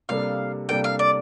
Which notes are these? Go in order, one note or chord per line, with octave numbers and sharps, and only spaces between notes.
C3 G3 A#3 D4 A4 F5
C3 G3 A#3 D4 A4 G5
F5
D5